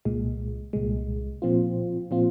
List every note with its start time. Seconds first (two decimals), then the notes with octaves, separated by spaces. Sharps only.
0.05 C2 A#2 G#3
0.73 C2 A#2 G#3
1.42 A#2 F3 C4 F4
2.11 A#2 F3 C4 F4